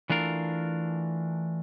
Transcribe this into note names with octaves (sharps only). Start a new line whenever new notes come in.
E3 A3 D4 F4 A#4